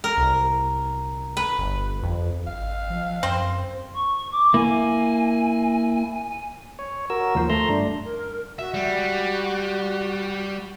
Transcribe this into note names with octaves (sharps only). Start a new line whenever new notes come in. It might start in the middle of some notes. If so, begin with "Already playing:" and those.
A#4
C2
B4
G1
F2
G#1 F5
F3
F#2 C4 C5
C#6
D6
A#3 E4 G#5
G#5
C#5
F#4 A#4 E6
D#2 F3 C5
A3 A#5 C6
G2 D4
A#4
F#4 E5
G3